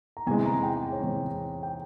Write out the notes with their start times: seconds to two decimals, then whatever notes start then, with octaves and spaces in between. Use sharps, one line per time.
0.17 A#5
0.27 E2 C3 E3 G#3 G#5
0.46 A#5
0.63 G5
0.92 C#5
1.00 E2 C3 E3 G#3 C5
1.63 G5